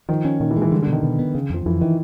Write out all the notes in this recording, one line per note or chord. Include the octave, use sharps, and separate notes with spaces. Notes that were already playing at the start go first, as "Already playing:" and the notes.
D#3 F3
C#4
A#2 D#3
E3
G#3
E3
D3 G3
D3
B2
D#3
B2
B3
C#3
F2 F3
F2 E3
D#3 E3